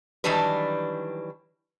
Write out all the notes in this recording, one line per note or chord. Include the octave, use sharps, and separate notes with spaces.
D#3 E3 F#3 G3 D4 B4